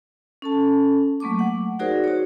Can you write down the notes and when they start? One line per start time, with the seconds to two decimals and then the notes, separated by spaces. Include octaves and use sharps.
0.42 C#4 A4 A5
1.20 F#3 A3 A#3 C#6 D6
1.39 F#5
1.79 D#4 F#4 G#4 A#4 C5 D5
2.04 F#4 C#5